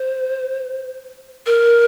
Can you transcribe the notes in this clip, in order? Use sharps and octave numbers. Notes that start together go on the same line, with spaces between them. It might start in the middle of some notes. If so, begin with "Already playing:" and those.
Already playing: C5
A#4